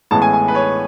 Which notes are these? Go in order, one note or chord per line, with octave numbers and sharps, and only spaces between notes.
A1 A2 E3 G#3 B3 A5
G#5
G#5
B4
C#5